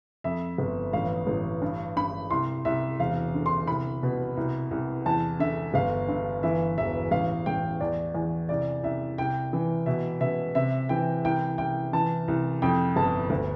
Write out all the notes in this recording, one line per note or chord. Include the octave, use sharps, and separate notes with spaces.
F2 E5
G1
A1 F5
A1
G2
G2 B5
C2 C6
C2 E5
E1 F5
D3
C6
C2 B5
B2
C2
C2
E2 A5
D3 E5
G1 F5
G2
E3 E5
E1 E5
A1 F5
A1 G5
E2 D5
E2
C2 D5
C2 E5
C2 G5
E3
B2 E5
B2 E5
C3 E5
E3 G5
C2 G5
C2 G5
E3 A5
C2
F2 G5
G1 A5
D2